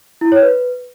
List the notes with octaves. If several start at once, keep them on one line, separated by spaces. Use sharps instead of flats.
E4
C#5
B4